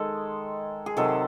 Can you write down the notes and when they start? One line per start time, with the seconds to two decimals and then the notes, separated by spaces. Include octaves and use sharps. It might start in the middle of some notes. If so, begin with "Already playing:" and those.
Already playing: D#3 G#3 A4
0.86 G#4
0.97 C3 D#3 F#3 A4